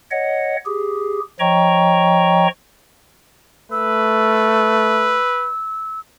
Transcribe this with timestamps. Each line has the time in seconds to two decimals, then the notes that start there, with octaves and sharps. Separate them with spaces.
0.11 C#5 D#5 F#5
0.66 G4 G#4
1.40 F3 C#5 D#5 G5 A#5 C#6
3.72 A3 B4 E6